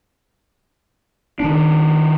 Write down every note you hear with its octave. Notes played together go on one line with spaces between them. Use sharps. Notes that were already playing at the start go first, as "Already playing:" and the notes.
D#3 D4